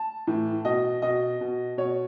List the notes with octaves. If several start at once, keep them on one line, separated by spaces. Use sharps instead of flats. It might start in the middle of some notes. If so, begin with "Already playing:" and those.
Already playing: A5
A2 E3
B2 D#5
B2 D#5
B2
B2 C#5